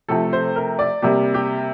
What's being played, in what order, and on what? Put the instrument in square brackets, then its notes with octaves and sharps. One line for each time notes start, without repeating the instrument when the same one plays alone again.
[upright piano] C3 F3 A3 A4
C5
A#4
D5
C3 G3 A#3 G4
G4